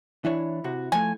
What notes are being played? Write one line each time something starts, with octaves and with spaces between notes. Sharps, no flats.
E3 D4 E4 C#5
C3 F#4
F3 A3 G#5